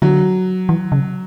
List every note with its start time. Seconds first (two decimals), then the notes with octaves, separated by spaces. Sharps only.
0.02 D3 F#3
0.69 E3
0.92 C#3